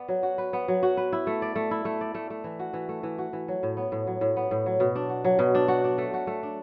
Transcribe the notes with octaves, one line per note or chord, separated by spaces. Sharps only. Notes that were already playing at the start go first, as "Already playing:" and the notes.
Already playing: B3 D5
F#3
F#4
B4
B3
F#3
F#4
B4
E4
A3
D5
A3
E4
A3
D5
A3
A3
E3
F#4
E3
A3
E3
F#4
E3
F#3
A2
B3
A2
F#3
A2
B3
A2
F#3
B2
D4
F#4
F#3
B2
D4
F#4
D4
A3
F#4
A3
D4